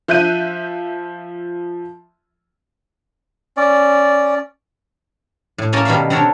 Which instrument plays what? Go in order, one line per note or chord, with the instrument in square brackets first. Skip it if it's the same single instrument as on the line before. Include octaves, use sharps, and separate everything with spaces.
[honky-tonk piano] F3 E5 F#6 G6 D#7
[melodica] C#4 D5
[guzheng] A2
A#3 C#4 A4 A#4 G#5 A5
B2 D#3 G3 C#5 E5 F5
D3 C4 D4 A4 A#4 C#5